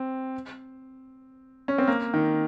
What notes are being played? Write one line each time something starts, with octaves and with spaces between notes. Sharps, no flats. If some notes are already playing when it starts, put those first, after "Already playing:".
Already playing: C4
C#4
C4
A#3
D#3